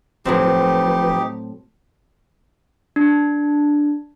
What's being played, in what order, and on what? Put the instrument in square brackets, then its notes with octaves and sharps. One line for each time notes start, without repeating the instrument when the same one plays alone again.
[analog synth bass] D1 [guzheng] A2 F#3 C4 [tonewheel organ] F3 B4 [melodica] D#4 G4
[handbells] D4